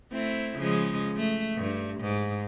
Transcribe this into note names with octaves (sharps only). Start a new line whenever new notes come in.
A3 C4 E4
C#3 F3 G#3
A3
G2
G#2